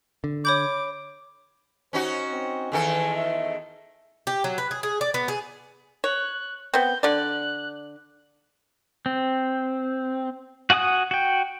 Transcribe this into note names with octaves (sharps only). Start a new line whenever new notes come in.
D3
C#5 B5 D6 G6
C#4 D#4 F#4 C5
C4
E2 D#3 A4 G#5
E5
G4
F#3
B4
G#4
G#4
D5
B3
G#4
C#5 F#6
B3 C4 G6
D3 D5 F#6
C4
F#4 F#5 G#5 D6 D#6
F#4 G5